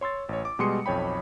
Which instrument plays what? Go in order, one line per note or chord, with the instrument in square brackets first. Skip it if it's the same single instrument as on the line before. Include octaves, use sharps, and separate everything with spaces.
[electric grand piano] C#5 C6 E6 A6
A1 C#5
D6
B2 G3 G#3 C6 D#6 C#7
B1 F2 C#5 G5 B5